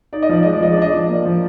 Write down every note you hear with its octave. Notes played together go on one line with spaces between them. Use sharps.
D#4 D5
D#5
F3 D5
G#3 D#5
D5
F3 D#5
D5
D4 D#5
F3 D5
A#3
F3